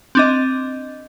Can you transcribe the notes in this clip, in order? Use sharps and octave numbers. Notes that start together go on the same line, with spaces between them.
C4 D4 D#5